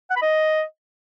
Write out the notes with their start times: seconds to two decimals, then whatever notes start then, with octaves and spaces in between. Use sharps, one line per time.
0.10 F#5
0.16 B5
0.22 D#5